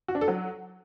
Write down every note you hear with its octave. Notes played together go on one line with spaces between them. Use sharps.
F#4
D4
A4
F#3